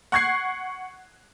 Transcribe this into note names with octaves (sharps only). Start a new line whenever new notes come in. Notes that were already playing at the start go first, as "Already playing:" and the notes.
F#5 C#6 F#6 G#6 C7